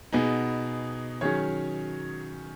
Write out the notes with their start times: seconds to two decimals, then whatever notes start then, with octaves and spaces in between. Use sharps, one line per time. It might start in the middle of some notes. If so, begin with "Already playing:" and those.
0.13 B2 B3 D#4 G#4
1.21 D#3 F#3 C#4 G#4 C#5